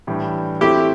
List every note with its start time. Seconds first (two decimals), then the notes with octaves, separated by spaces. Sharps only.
0.07 A2 E3 G3 D4 G4
0.61 A3 C4 E4 F#4 G4 C5 E5